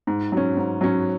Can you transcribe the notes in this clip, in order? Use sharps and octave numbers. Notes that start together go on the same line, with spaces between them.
G#2
F#3 C#4
G#2
F#3 C#4